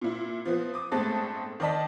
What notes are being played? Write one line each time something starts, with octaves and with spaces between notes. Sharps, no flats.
A#2 E4
F3 B3 C4
D6 D#6
G1 A2 G#3 C4 A4 A6
D#3 D5 D#5 A5 B6